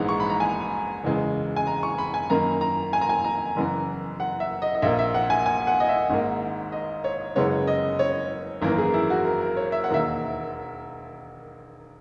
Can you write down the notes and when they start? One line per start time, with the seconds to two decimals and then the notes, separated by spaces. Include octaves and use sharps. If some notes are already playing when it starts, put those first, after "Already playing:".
Already playing: A#1 G#2 E3 G#3 B3 A#5
0.09 C#6
0.20 B5
0.30 A#5
0.40 G#5
1.03 F#1 E2 C#3 G#3
1.56 G#5
1.67 A#5
1.83 C#6
1.98 B5
2.14 G#5
2.30 F#2 D#3 A#3 A#5
2.61 A#5
2.93 G#5
3.01 A#5
3.09 G#5
3.24 A#5
3.56 F#1 F#2 E3 B3
4.20 F#5
4.40 E5
4.62 D#5
4.75 D#5
4.82 A#1 A#2 A#3 E5
4.99 E5
5.14 F#5
5.30 G#5
5.46 G#5
5.67 F#5
5.80 D#5
5.89 E5
6.10 G#1 G#2 D#3 A#3
6.72 D#5
7.04 C#5
7.35 F#1 F#2 C#3 G#3 B3 C#5
7.67 D#5
7.99 C#5
8.62 G#1 F#2 E3 A#3 A#4
8.78 G#4
8.94 E4
9.10 F#4
9.25 A#4
9.41 A#4
9.57 C#5
9.72 E5
9.84 F#5
9.89 E1 D#2 D#3 A#3 E5